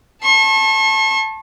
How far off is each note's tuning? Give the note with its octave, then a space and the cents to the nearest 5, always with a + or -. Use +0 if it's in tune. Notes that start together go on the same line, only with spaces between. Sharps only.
A5 +0 C#6 -40